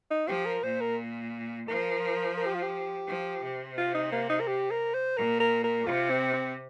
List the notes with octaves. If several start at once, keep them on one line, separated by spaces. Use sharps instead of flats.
D#4
F3 G4
A#4
A#2 C5
A#4
F3 A#4
A#4
G4
F4
G4
F3
C3
F4
D#4
A#3
D#4
A#4
G4
A#4
C5
A#2 A#4
A#4
A#4
C3 F4
C4
C4